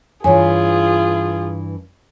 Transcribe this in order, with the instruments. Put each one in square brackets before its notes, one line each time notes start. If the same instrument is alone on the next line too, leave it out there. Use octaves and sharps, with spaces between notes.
[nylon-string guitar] G2 E3 [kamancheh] F4 G#4 [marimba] C#5 G#5